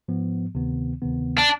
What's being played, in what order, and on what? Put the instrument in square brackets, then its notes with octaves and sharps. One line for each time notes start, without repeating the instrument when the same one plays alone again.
[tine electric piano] G#2 F3 B3
D2 C3 D#3 B3
D2 C3 D#3 B3
[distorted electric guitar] D4